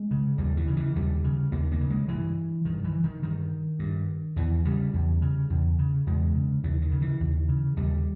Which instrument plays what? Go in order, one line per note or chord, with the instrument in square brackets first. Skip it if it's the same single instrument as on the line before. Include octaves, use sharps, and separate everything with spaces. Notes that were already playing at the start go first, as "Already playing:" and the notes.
Already playing: [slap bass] G#3
C#3
D#2 G3
E3
C#3
E3
D#2 G3
C#3
D#2 A#3
A#3
C#3
G#3
G2 E3
G2 D#3
E3
D#3
G2 D#3
G2
E2 E3
C#3 G3
E2
C#3
E2
C#3
E2 G#3
C#3
D#2 E3
D#3
C#3
E3
D#2
C#3
D#2 G3